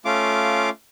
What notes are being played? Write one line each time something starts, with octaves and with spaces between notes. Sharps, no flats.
A3 C#4 F4 F5 D6